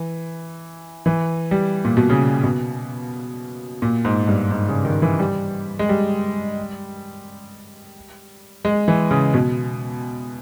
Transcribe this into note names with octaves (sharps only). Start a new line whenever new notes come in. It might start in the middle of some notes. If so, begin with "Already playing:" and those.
Already playing: E3
E3
G3
A#2
B2
C#3
B2
A#2
G#2
G2
G#2
C#3
D#3
E3
G3
G#3
G3
G#3
E3
C#3
B2